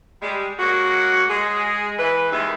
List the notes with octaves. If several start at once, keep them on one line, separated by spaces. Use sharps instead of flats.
G3 G#3
G#3 A#3 C#4 F#4
G#3 G#4
E3 B4
D#2 C3 D#3 E3 G#3 E5